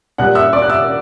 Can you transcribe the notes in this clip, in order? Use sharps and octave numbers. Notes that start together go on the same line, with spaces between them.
A#2 G3 F#5 F#6
E5 E6
D5 D6
F#6
E5 E6